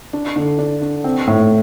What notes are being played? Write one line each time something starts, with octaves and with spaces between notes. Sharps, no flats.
D4
D3
D4
D4
C4
A2